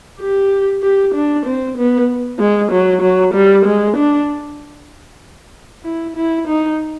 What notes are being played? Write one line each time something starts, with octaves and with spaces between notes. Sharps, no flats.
G4
G4
D4
C4
B3
G#3
F#3
F#3
G3
G#3
D4
E4
E4
D#4